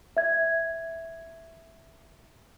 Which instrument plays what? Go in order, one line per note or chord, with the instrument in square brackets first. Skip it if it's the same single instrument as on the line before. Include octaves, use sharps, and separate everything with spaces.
[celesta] E5 G#6